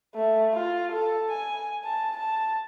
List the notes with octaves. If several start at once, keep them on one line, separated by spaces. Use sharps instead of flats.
A3
F4
A4
G#5
A5
A5